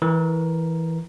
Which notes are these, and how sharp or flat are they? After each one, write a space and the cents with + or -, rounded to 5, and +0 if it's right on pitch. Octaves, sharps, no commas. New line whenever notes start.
E3 -10 A#4 +5